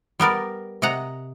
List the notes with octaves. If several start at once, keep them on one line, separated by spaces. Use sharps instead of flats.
G3 B3 A#4 D5
C3 D#5 F#5 A#5